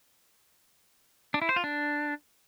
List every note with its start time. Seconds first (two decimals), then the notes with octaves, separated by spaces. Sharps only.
1.34 D4
1.42 E4
1.49 C5
1.56 F4
1.64 D4